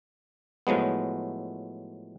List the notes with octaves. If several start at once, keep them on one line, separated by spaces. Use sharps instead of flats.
A2 F3 F#3 G#3 B3